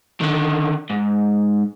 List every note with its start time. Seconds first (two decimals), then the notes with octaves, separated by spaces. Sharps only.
0.21 D3 D#3
0.90 G#2